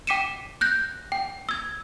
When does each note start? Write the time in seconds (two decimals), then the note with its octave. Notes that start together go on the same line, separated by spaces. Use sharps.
0.07 G5 D6 B6 C#7 D#7 E7
0.61 F#6 G6 A#6
1.12 G5
1.49 E6 G#6